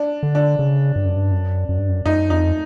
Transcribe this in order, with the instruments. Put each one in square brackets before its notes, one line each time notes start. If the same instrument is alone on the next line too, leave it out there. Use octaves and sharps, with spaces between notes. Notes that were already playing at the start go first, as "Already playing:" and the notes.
Already playing: [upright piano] D4
[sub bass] D3
[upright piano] D4
[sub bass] C#3
G2
F#2
G2
F#2
F#2
G2
F#2
[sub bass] F#2 [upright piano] D#4
[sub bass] F2 [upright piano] D#4